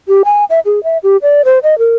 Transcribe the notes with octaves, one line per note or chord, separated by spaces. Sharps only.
G4
G#5
E5
G#4
E5
G4
D5
C5
D#5
A#4